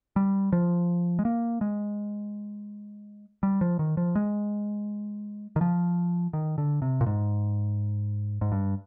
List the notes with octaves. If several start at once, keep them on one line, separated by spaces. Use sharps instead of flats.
G3
F3
G#3
A#3
G#3
G3
F3
D#3
F3
G#3
D#3
F3
D#3
D3
C3
A#2
G#2
G#2
G2